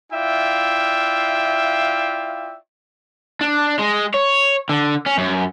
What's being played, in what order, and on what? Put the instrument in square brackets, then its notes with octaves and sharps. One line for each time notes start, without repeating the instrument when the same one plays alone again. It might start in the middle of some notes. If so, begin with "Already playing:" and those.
[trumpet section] E4 F4 D5 E5 F5 G5
[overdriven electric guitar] D4
G#3
C#5
D3
C#4
F#2